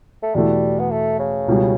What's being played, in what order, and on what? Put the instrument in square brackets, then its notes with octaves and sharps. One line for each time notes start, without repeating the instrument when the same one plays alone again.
[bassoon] A3
[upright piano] E2 B2 A3 [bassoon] G3
[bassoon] B3
A3
C#3
[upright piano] C#2 B2 G3